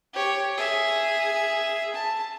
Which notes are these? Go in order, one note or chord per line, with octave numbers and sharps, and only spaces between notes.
G4 C#5
G#4 E5
A5